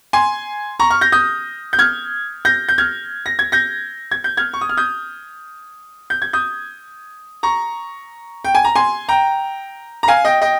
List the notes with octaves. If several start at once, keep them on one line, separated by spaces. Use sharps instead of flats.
G#5 C6
A#5 C#6
C#6 F6
G6 A#6
D#6 G6
G6
F6 G#6
G6 A#6
G6
F6 G#6
A#6
G#6
G6 A#6
G#6
G6
F6 G#6
C#6
D#6
F6
D#6 G6
G6
G#6
D#6 G6
A#5 C#6
G5
G#5
A#5
G#5 C6
G5 A#5
A#5
F5 G#5
D#5 G5
D#5 G5